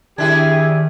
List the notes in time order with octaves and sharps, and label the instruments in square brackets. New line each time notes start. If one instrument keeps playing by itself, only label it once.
[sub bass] D#3 [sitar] D4 E4 G#4 [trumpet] G4 [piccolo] G#6